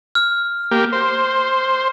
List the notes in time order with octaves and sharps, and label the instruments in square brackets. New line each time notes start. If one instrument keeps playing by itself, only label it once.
[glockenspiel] F6
[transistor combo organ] A#3 G4
C5